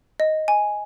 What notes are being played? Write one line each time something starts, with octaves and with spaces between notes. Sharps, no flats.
D#5
G#5